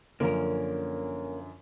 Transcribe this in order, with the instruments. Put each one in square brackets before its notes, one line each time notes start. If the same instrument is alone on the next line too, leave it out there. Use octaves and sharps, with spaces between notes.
[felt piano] F#2 D3 F3 [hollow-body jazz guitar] A#3 C#4 A#4